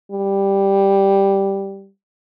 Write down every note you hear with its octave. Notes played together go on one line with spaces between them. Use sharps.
G3